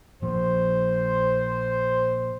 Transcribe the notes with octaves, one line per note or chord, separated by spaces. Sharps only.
A#2 F3 C5